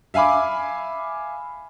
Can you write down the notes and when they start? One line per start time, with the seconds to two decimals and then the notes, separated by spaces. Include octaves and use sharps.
0.14 E5 F5 G#5 B5 D6